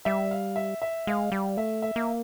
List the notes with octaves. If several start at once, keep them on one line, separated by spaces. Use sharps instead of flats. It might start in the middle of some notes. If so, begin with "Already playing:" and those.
G3 E5
F5
E5
E5
G#3 F5
G3 F5
A3 E5
E5
A#3